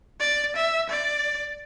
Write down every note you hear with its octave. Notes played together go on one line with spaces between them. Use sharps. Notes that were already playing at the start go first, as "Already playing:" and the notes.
D5
E5
D5